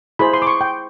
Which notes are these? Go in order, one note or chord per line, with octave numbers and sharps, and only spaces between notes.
E4 G#4 C5 B5
C6
D6
C#6
G5